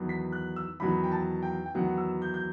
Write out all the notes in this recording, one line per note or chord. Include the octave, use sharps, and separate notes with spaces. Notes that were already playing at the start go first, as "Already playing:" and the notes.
Already playing: E2 D#3 F#3 B3
B6
F#6
E6
E2 D#3 F#3 B3 B5
G5
A5
G5
G5
E2 D#3 F#3 B3 F#5
E6
G6
G6